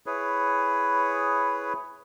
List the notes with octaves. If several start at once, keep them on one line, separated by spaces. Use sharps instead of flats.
E4 G#4 B4 C#5